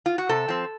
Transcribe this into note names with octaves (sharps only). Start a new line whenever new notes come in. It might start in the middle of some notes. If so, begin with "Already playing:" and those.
F4
F#4
C3 A4
F3 C4